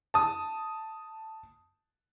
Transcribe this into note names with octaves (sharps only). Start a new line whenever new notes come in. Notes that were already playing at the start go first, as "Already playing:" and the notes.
A5 D#6